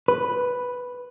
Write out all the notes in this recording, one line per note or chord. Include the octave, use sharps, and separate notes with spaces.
B4